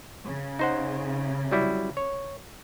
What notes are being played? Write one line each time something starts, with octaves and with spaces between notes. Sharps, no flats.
C#3
D#4 C5 F#5
F#3 G3 E4
C#5